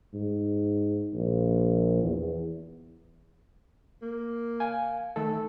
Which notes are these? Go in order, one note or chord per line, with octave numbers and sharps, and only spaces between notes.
G#2
A#1
E2
A#3
F5 G#5
D#3 A3 A4